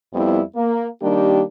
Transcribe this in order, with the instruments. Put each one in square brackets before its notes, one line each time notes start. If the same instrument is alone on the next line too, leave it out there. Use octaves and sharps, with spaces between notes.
[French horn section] F2 G3 B3 E4
A#3
D#3 G3 A#3 D4 G4